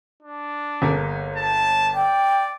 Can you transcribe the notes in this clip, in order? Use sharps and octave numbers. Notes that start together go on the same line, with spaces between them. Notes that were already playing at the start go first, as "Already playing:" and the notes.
D4
G1 A#3 G#4
A5
D5 G5